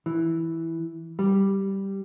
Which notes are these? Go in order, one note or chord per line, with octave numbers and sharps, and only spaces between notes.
E3
G3